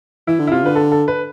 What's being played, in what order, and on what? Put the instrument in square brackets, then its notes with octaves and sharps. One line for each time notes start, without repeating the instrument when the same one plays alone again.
[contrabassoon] E3 [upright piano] E4
[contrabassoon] D3
[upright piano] E4
[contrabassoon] C3 [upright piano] F4
[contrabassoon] D3 [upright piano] B4
[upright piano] A4
A4
B4